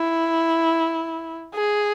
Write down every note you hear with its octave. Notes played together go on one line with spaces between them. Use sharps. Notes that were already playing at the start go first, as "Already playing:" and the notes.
Already playing: E4
G#4